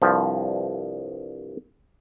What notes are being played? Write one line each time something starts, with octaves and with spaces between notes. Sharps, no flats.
C2 G2 F3